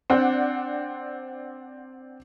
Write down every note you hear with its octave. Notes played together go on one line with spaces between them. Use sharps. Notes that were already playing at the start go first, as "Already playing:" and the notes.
C4 D4 F#5